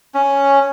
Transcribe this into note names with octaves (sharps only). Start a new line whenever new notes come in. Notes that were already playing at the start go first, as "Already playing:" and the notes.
C#4